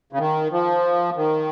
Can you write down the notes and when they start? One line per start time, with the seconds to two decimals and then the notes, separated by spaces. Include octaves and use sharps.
0.13 C#3
0.19 D#3
0.52 F3
1.16 D#3